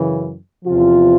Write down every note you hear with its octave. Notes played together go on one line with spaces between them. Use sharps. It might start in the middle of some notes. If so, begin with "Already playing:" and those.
Already playing: F#2 C#3 E3
E2 C3 F3 F4